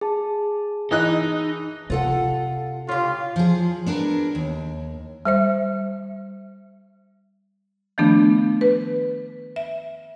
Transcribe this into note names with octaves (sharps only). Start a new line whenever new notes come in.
G#4 A5
E3 D#4 D#5 F#6
C3 F4 A4 F#5
C#3 F4 G4
F3 G#4
B3 D4 G#4 A#4
D#2
G3 C5 E5
D#3 F3 A3 B3 D4
B4
E5